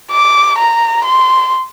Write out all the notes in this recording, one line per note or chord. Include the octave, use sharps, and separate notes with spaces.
D6
A#5
C6